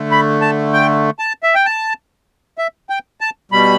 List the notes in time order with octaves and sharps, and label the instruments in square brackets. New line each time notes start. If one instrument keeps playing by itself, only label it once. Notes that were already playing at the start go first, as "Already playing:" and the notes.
Already playing: [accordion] D3 A3
B5
A5
G5
A5
E5
G5
A5
E5
G5
A5
B2 G3 B5